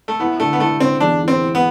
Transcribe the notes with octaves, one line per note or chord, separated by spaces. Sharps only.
A3
B3 E4
D3 A3
B3
A3 E4
D3 C4
E2 D4
E4
C4
E4
B3